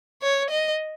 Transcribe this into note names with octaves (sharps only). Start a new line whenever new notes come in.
C#5
D#5